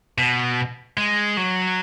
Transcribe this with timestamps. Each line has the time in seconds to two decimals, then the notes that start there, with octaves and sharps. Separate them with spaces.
0.18 B2
0.97 G#3
1.37 F#3